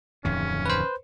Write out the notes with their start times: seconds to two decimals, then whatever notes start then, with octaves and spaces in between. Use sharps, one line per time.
0.25 D1 F2 D#3 C#4
0.66 B4 C5